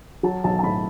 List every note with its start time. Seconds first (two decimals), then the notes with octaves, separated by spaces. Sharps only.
0.23 F#3 A5
0.44 B1 A5
0.59 A5
0.63 A2 B5